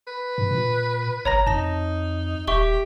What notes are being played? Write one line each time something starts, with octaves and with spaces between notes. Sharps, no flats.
B4
G2
A#2
G1 C#5 A#5 A#6
F2 D#4 A5 A#6
D#1 G4 E5 C#6 G7